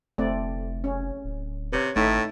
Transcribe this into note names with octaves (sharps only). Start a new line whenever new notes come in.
F1 A3 C4 D5
C#4
D1
C3 B4 C#5
G#1 A2 A3 D#4 E5